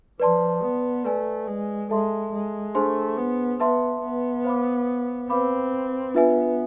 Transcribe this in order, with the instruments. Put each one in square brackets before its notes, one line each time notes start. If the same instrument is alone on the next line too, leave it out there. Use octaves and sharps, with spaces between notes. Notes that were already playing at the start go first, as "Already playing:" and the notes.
[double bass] F3 [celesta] B4 D5 A5 C6
[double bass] B3
[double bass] A3 [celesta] B4 D5 G#5
[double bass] G#3
[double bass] G#3 [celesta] A4 E5 A5 C6
[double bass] G#3
[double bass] A3 [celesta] D4 G#4 C5 G#5 C6
[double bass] B3
[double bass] B3 [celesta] B4 E5 A5 C6
[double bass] B3
[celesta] C5 F5 B5 D6
[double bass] C4 [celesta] B4 F5 B5 D6
[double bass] B3 [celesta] D4 F4 B4 E5 G#5